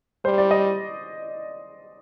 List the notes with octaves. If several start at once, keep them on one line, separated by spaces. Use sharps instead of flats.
G3 C5
D5
D#5